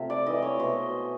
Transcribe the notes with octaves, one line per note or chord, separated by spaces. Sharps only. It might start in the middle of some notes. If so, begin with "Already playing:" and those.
Already playing: C3 F3 A3 F5
D5
E3 A3 D#5
C#5
B2 C5